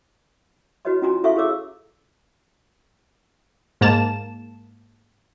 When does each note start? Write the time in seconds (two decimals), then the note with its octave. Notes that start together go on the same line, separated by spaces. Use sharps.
0.85 E4 F#4 B4 C#5 D#5 C6
1.02 C#4 F4 F#4 G#5 A#5 C6
1.24 E4 A4 E5 F5 C#6
1.36 E4 G#4 A#4 C#5 D6 E6
3.81 G#2 A#3 A5 E7